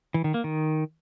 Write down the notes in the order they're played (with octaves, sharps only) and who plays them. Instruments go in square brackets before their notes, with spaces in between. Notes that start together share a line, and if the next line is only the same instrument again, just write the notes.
[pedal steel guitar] E3
D#3
A#3
D#3